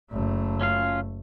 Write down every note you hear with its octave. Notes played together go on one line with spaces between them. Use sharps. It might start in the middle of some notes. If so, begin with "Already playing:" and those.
F#1 A3
C#4 F4 F5